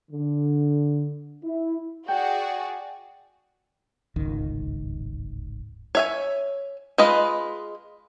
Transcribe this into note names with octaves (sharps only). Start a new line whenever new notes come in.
D3
E4
F#4 G#4 D5 G5 G#5
D1 G#1 C#2 D#3
C#5 E5 G#5
G#3 F4 B4 D#5